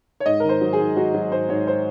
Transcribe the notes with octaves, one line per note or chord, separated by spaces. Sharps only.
C#5
G#2 D#5
D#3 A#4
C5
F#3
G#4
G#2
F#3 F#4
F#3
G#2 C5
G#2 C#5
C5